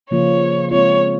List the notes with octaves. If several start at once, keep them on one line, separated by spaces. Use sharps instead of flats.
C#3 F3 A#3 F4 C#5
G#3 C4 F4 C#5